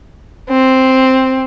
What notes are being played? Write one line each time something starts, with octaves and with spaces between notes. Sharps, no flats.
C4